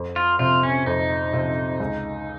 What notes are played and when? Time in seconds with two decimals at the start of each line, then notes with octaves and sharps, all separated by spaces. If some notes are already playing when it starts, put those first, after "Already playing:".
Already playing: F2
0.16 F4
0.39 C3 F3 C4 F4
0.63 C#4
0.86 F2 D#4
1.33 C3 F3 C4
1.80 C#2